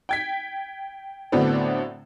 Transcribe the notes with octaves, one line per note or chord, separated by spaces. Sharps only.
G5 G#6 B6
A2 D3 F#3 B3 C4 D4